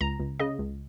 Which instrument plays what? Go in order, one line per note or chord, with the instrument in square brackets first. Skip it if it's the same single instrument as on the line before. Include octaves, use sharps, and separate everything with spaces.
[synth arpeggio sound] C#2 A#5
C#2
C#3 D#5
C#2